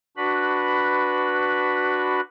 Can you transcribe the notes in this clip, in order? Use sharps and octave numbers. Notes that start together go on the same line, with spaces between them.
D4 F#4 B4 B5